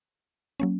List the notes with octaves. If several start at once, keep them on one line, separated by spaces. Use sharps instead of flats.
F#3 A#3 C#4